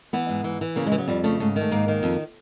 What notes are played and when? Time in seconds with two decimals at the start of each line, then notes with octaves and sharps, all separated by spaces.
0.13 E3 B3
0.29 G#2
0.44 E3
0.61 E3
0.76 C#3 A#3
0.86 G#3
0.92 E3
0.98 F#3
1.08 F2 G3
1.24 C#3 A3
1.40 G#2 A3
1.56 D#3 A3
1.71 G#2 A#3
1.88 D#3
2.03 F2